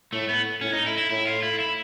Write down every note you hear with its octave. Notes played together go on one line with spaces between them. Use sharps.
A2 A3
B3
A2 C#4
D#4
E4
E4
A2 E4
F4
E4
E4